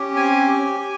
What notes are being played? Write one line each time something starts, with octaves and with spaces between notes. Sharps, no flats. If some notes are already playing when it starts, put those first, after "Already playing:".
Already playing: C#4 G4
C4 G#5
G4
G4